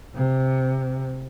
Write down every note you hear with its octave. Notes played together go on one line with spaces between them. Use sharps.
C3